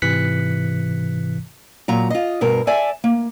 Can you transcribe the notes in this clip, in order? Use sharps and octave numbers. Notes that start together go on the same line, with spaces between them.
G#2 C3 E3 F#6 B6 C#7
A#2 F#3 A#5
F4 D#5
G2 B2 A#4
A4 D5 E5 G#5
A#3